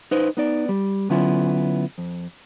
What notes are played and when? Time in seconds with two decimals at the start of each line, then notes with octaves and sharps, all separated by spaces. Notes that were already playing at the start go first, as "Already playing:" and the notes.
0.11 D#4 B4 C5
0.37 B3 D#4 D5
0.69 G3
1.10 D3 F#3 B3 C#4 E4 F4
1.98 F2